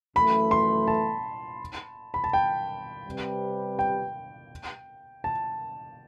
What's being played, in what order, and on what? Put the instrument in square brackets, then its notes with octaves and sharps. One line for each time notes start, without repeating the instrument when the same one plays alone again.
[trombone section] F#2 E3 A3 [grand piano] B5
[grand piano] C6
A5
B5
A5
G5
[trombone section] C3 G3 C4 G4 B4
[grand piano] G5
A5